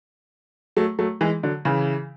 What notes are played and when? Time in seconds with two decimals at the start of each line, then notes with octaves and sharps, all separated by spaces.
0.77 F#3 A3
0.99 F#3 A3
1.21 E3 G#3
1.43 D3 F#3
1.65 C#3 E3